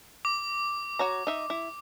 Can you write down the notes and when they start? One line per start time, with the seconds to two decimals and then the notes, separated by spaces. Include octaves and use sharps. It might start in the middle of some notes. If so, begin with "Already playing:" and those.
0.25 D6
0.99 F#4 C#5 A#5
1.27 D#4 E5
1.50 E4